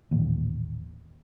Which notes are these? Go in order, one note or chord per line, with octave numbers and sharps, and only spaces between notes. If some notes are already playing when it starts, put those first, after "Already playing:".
D#1 A1 D#2